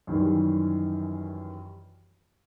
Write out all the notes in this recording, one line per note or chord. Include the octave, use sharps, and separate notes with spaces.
F#2 D#3 E3 G3